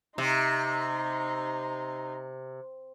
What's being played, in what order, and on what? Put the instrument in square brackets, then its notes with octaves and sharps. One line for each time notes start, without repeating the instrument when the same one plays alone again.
[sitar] C3 [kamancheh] D#4 C6